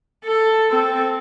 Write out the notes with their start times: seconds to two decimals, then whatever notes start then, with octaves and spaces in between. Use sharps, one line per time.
0.24 A4
0.70 C4 A4